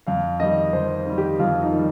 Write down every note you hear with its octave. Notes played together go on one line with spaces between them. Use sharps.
F2 F5
D#3 G3 D#5
F2 C5
D#3 G3
G4
F2 F4
D#4
D#3 G3